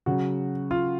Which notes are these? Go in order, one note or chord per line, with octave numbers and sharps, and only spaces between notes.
C#3 F#3 F#4
F4